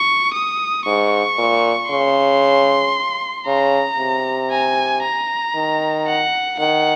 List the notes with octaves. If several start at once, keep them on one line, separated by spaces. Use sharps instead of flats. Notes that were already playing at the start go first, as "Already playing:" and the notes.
Already playing: C#6
D#6
G#2 C#6
A#2
C#3 C6
C#3 A#5
C3
G#5
A#5
D#3
F#5
D#3 F#5